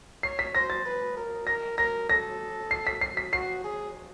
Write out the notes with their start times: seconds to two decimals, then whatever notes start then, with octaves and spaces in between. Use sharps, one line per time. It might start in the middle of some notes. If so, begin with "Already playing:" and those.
0.23 C#5 C7
0.39 B6
0.55 C5 A#6
0.70 A6
0.85 B4
1.17 A#4
1.47 A#4 A#6
1.78 A#4 A#6
2.10 A4 A#6
2.71 C7
2.87 B6
3.01 C7
3.17 B6
3.32 F#4 C7
3.64 G#4